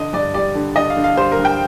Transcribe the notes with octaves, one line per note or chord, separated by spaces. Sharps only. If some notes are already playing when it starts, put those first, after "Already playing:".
Already playing: D3 D#5
G2 D5
G3 D5
D3
D3 D#5
F5
D3
F5
G3 C5
A#4
G2
G5